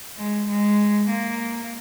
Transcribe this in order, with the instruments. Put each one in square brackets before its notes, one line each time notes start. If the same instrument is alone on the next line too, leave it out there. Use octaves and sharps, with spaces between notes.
[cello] G#3
G#3
A#3